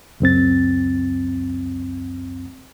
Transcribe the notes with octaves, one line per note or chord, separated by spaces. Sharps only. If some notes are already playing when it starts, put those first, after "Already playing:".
C#2 F#2 C4 A6